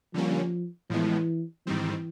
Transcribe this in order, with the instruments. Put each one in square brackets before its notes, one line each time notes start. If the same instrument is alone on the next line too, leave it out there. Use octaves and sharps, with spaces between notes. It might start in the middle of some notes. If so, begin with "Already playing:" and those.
[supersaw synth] D3 G3 A#3 C#4 [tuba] F3
[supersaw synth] A2 F3 G#3 B3 [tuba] E3
[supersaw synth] G#2 D#3 G3 C4 [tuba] E3